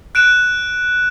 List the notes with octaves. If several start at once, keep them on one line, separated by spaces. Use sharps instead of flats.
F#6 D7 E7